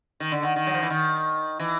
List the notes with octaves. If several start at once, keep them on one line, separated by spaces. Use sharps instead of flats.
D#3
D3
D#3
D#3
F#3
F3
E3
D#3
E3